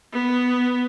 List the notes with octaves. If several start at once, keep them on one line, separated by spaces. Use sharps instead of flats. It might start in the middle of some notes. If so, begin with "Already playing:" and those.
B3